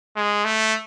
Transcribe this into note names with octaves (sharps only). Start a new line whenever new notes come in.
G#3
A3